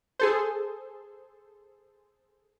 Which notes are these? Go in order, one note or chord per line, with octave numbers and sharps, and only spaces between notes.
G#4 A4 C5